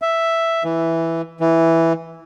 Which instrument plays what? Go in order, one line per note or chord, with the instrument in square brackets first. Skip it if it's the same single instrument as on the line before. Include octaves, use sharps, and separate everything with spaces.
[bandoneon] E5
E3
E3